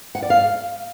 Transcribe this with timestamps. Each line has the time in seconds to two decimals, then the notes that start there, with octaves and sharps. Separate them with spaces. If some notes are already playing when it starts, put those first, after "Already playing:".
0.15 F#5
0.23 D5
0.30 F5